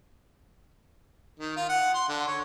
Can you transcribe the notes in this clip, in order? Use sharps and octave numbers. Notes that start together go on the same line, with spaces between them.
D#3
F4
F#5
C6
D3
C#5